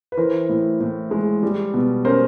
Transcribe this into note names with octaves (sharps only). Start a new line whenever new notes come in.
B4
E3 A#4 C5
A2
A2
G#3
G3
B2
C#4 A#4 C5